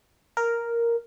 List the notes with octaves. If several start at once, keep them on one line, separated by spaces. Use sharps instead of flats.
A#4